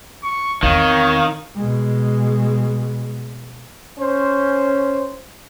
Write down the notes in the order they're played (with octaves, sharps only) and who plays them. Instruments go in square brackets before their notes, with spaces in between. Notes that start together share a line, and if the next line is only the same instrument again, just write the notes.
[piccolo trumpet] C#6
[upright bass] E2 C4 [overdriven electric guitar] D#3 [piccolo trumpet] C#5 [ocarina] F5
[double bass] B2 G#3
[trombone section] C#4 C5